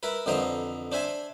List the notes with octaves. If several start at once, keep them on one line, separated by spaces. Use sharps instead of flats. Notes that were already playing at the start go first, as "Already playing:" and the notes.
E4 A#4 B4
F2 D3 E3 C5 D#5 A#5
D4 C5 E5 G#5